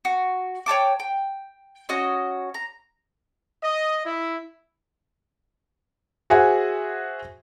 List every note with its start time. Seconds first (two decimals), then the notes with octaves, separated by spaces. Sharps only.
0.05 F#4
0.66 C#5 G5 A5 D6
1.00 G5
1.89 C#4 F#4 D#5
2.54 A#5
3.62 D#5
4.05 E4
6.30 F#4 G#4 C5 E5 F#5 G#5